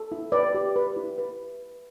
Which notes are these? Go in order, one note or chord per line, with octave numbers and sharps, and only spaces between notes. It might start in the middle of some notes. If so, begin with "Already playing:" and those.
Already playing: A4
E4
B4 D5
G4
B4
E4
B4